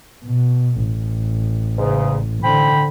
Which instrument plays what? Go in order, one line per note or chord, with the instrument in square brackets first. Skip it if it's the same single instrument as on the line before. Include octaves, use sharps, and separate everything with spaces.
[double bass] B2
A1
[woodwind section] E2 G#2 C#3
[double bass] D3 [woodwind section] C5 G5 B5